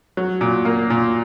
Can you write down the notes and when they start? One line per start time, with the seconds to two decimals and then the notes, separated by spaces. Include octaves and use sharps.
0.17 F#3
0.41 A#2
0.65 A#3
0.90 A#2